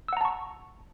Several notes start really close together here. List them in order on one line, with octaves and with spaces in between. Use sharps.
E6 F#5 A#5 A5 C#6